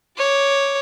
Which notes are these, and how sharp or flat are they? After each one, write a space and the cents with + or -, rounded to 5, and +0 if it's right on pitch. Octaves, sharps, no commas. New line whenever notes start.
C#5 +0 D6 +0